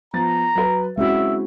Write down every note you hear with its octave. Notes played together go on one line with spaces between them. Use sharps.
F3 B3 A#5 A6
F#3 B4
G#3 C4 C#4 E4 F#4 E5